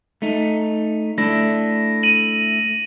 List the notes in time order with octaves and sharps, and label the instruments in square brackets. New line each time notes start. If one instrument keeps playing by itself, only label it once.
[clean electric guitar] A3 D#4
[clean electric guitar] A3 D4 E4 [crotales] A#6
[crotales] D#7 F#7